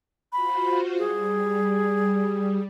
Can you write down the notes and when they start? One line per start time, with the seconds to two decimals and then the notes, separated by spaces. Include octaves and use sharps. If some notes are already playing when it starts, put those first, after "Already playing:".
0.33 F4 F#4 C5 B5
0.98 G3 G#4